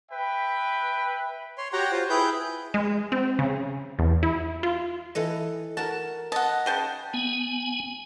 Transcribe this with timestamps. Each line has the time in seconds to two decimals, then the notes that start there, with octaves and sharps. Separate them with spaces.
0.11 B4 E5 G5
1.58 C#5 C6
1.73 F#4 G4 C#5 F#5 G5 A#5
1.92 F4 C5 F5
2.10 E4 G#4 B4 G5 G6
2.74 G#3
3.12 C4
3.39 C#3
3.99 E2
4.23 E4
4.63 F4
5.15 E3 A4 D#5
5.77 F#4 A#4 A5
6.32 D#5 F#5 A5
6.66 C#3 G5 A5
7.14 B3 G#5